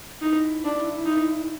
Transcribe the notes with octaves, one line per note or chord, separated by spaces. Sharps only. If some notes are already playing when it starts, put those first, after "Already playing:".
D#4 E4
D4
D#4